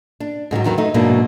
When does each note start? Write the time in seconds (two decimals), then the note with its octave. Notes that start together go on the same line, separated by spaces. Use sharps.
0.20 D4
0.51 G#2 D3 D#3 F#3
0.64 E2 D#3 E3 F#3
0.78 A3 D#4
0.94 G#2 B2 E3 F#3 A#3 D4